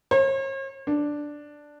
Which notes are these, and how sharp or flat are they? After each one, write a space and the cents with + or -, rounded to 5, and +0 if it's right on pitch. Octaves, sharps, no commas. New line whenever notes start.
C#5 -45
D4 +0